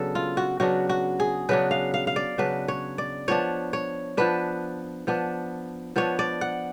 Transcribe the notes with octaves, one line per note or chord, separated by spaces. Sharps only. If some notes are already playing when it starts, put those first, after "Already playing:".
Already playing: C#3 F#3 B3 D4 A4
F4
F#4
C#3 F#3 B3 D4 F#4
F#4
G#4
C#3 F#3 B3 D4 B4
F5
F5
F5
D5
C#3 F#3 B3 D4 B4
C#5
D5
F3 B3 D4 C#5
C#5
F3 B3 D4 B4
F3 B3 D4
F3 B3 D4 C#5
D5
F#5